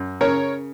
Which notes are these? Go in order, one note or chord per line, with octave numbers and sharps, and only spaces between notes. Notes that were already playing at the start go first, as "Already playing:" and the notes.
Already playing: F#2
C#3 A#4 C#5